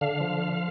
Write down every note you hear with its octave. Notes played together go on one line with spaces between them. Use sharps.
D3 F5
F3